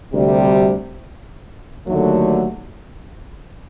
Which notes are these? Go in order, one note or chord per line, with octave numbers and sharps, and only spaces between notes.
D2 C3 G3
D#2 D3 F#3 A3